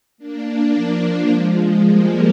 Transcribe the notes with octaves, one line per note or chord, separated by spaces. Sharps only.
A#3 D4
F3
F3 G#3
F3 G#3
G3 A#3